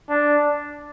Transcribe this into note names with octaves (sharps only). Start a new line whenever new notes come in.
D4